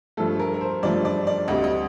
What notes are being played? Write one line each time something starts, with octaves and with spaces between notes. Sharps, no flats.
G2 F3 A3 A4
A#4
A#4
C5
G2 F3 A3 D5
D5
D5
D2 C3 G3 D#5
D#5